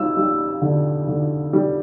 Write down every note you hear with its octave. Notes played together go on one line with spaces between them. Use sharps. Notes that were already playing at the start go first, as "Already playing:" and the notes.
Already playing: G3 E6
G3
D3
D3
G3